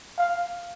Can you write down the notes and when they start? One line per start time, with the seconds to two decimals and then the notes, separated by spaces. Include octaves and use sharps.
0.18 F5